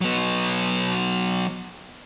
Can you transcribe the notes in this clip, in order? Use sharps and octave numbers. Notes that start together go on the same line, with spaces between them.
F#3 B3